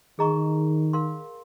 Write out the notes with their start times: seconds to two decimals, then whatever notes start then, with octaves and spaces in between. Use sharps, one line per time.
0.19 D#3 G#4 D#5 A#5 C#6
0.93 A#4 F5 C6